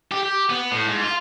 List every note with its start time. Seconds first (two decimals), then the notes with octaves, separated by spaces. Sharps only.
0.12 G4
0.23 G4
0.50 B3
0.72 A2
0.87 G#2
1.02 F4